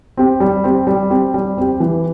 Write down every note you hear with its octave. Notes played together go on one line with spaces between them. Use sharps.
C4 G4
G3
C4 G4
G3
C4 G4
G3
C4 G4
E3